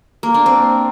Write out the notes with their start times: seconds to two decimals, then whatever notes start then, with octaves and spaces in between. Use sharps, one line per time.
0.23 A#3
0.34 D4
0.46 C4